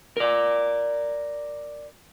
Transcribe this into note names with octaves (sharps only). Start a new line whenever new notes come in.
A#4 D5